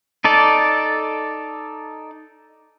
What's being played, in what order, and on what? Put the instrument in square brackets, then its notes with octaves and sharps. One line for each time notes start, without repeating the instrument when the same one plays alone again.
[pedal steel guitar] D#4 A4 D5